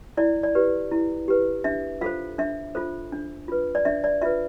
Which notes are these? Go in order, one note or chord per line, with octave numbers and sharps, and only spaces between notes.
E4 D5
D5
G4 B4
E4
G4 B4
D4 E5
F4 A4 C5 F5
D4 E5
F4 A4 C5
D4
F4 B4
D5
D4 E5
D5
F4 B4 E5